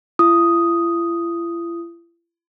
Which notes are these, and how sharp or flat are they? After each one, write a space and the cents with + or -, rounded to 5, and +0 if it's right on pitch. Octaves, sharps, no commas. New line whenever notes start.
E4 +45 D#6 +0